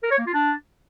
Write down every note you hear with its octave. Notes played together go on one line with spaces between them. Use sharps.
A#4
C#5
A#3
F4
D4